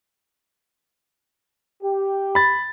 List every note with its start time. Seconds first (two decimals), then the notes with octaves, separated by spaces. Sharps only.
1.83 G4
2.35 B5 A6